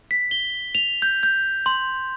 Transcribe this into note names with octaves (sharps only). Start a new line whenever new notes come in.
B6
G7
F7
G6
G6
C6